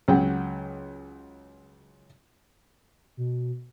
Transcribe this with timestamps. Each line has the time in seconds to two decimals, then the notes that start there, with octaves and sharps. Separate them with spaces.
0.08 C#2 F#3 F#5 G5
3.17 B2